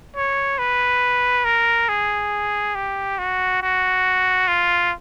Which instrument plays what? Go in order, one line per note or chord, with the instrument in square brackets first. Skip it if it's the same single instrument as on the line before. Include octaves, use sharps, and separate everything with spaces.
[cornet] C#5
B4
A#4
G#4
G4
F#4
F#4
F4